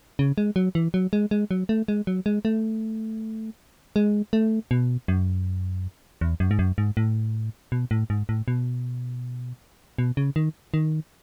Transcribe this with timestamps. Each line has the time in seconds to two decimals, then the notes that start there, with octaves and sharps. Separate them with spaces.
0.19 C#3
0.38 G#3
0.56 F#3
0.75 E3
0.94 F#3
1.13 G#3
1.31 G#3
1.51 F#3
1.69 A3
1.88 G#3
2.07 F#3
2.26 G#3
2.45 A3
3.96 G#3
4.33 A3
4.71 B2
5.08 F#2
6.21 E2
6.40 F#2
6.51 G#2
6.59 F#2
6.78 G#2
6.97 A2
7.72 B2
7.91 A2
8.10 G#2
8.29 A2
8.48 B2
9.98 B2
10.17 C#3
10.36 D#3
10.74 D#3